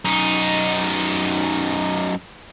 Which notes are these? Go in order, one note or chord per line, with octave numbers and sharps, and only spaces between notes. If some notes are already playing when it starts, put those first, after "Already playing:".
F#2 D#4